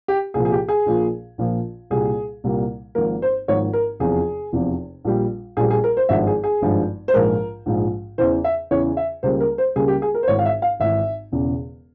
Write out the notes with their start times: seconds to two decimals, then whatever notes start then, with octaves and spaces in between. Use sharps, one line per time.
0.08 G4
0.34 C2 A#2 F3 G#4
0.45 G#4
0.52 G4
0.69 G#4
0.86 A#1 A#2 F3
1.38 A#1 A#2 F3
1.90 C2 A#2 G3 A#3 G#4
2.44 C2 A#2 G3 A#3
2.95 G#1 G#2 F3 A#3 A#4
3.22 C5
3.48 G#1 G#2 F3 A#3 C#5
3.73 A#4
4.00 F1 E2 C3 F3 G#4
4.53 F1 E2 C3 F3
5.05 A#1 A#2 G3
5.57 A#1 A#2 G3 G#4
5.71 G#4
5.84 A#4
5.97 C5
6.09 G#1 G2 F3 G#3 E5
6.27 G#4
6.44 G#4
6.62 G#1 G2 F3 G#3
7.08 C5
7.13 A#1 G#2 F3 G#3 A#4
7.66 A#1 G#2 F3 G#3
8.18 E2 C#3 E3 C5
8.44 E5
8.71 E2 C#3 E3 C#5
8.97 E5
9.23 C#2 C#3 G3 A#3 C5
9.40 A#4
9.58 C5
9.75 C#2 C#3 G3 A#3 G#4
9.88 G4
10.02 G#4
10.14 A#4
10.23 C5
10.28 G#1 G#2 E3 C#5
10.39 F5
10.45 E5
10.62 F5
10.80 G#1 G#2 E3 E5
11.32 E1 E2 C#3